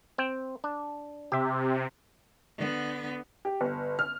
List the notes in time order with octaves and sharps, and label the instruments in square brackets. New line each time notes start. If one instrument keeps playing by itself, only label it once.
[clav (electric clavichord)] C4 G5
D4
[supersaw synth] C3 [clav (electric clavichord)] G4 E5
[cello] D3 B3
[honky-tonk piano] G4
G1
F6